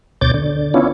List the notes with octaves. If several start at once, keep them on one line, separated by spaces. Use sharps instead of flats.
D2 B2 C#5 D6 G6 A6
D3
B3 C#4 D4 E4 F4 C#5